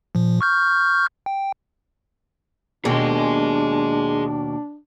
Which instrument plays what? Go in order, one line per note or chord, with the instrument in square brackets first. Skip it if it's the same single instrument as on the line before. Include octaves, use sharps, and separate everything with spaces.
[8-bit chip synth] A#2 F3
C#6 F6 G6
G5
[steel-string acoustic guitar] D#2 B2 A#3 [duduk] D4 [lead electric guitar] G#4 D#5